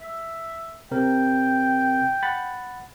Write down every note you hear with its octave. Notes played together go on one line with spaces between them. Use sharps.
E5
C3 C4 A#4 G5
F#5 B5 A6